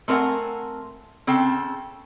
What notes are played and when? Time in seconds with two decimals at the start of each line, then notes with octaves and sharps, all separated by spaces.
0.08 A3 C4 A#4 C#5 F#5 G#5
1.27 C#3 C4 A4 G5